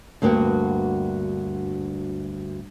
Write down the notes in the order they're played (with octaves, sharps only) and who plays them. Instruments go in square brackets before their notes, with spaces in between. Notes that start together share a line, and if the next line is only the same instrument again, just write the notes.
[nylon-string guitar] D2 G2 A#3 B3 F#4 G5